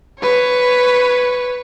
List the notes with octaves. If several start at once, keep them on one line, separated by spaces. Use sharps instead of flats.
B4 C#5